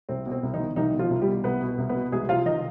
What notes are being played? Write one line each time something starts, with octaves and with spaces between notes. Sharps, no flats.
C2 C4
B2
C4
C2
D#3 D#4
B2
C2 D#3 D#4
B2
F3 F4
C2
G3 G4
B2
C2 B3 B4
B2
C2
B3 B4
B2
C2 G#3 G#4
C3 F4 F5
D#3 D#4 D#5